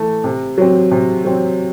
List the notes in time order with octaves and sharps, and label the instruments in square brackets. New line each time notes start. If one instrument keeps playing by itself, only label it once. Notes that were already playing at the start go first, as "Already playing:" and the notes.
Already playing: [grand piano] E3 A3
C3
F#3 C4
C3
F#3 C4